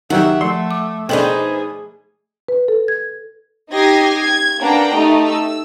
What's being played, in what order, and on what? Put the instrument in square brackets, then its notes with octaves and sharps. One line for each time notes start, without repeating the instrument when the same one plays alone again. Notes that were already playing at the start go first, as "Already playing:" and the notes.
[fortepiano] D#3 F#3 G4 [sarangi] E5 [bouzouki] F#5
[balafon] F3 [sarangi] A3 [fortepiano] C6
[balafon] D6
[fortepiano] B2 D4 [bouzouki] D#4 B4 C5 [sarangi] G#4 [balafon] A4 G5
[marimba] B4
A4
G#6
[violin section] D#4 G4 D#6 G#6 A#6 C7
G#6
A#3 D4 B4 F#5 G5 A#5
A3 D#4 G4
E6